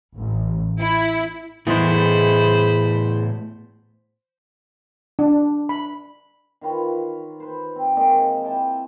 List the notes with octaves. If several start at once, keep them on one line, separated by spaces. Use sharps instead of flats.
A1
E4
A2 E3 G#3 A3 B3 G#4 C5 B5
D4
B5
D#3 F4 B4 C#5
B4 C5
C4
G#3 A#3 C4 D#5
E4 G5 A5